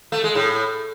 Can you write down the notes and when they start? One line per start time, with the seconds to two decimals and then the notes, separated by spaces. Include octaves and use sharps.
0.12 A3
0.24 G#3
0.35 A2